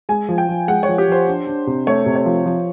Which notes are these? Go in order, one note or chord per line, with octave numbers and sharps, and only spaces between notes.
G#3 G#5
F3
G5
F3
G#3 F#5
C#5
F3
G4
F3 C5
D4
D4
C3
A3 C#5
C3
C#5
F3
F3